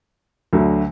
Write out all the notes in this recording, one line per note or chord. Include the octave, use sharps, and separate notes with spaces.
D2 D3 F#3 A3